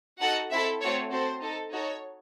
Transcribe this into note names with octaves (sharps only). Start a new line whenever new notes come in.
D#4 F#4 A4 F#5
C4 E4 A4 E5
A3 C4 F#4 A4 C#5
C4 F#4 A4 C5
D#4 A4
D#4 F#4 A4 C#5